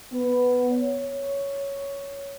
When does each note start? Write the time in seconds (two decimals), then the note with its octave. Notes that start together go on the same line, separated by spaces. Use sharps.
0.12 B3
0.70 C#5